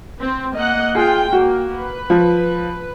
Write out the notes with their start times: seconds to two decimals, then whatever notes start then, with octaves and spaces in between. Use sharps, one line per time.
0.19 C4
0.56 A#3 D#5 F#5
0.95 F4 G#4 G5
1.33 A#3 F#4
1.73 B4
2.10 F3